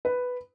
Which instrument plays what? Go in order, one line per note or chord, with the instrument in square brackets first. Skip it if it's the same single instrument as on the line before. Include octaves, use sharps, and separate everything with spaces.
[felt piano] B4